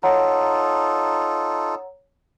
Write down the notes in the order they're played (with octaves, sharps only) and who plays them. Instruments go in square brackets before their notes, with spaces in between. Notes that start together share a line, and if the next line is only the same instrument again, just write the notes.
[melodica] D#4 F4 A4 [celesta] C#5 F#5 A#5